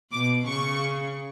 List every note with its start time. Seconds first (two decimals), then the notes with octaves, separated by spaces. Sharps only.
0.12 B2 D6
0.47 C#3 C#6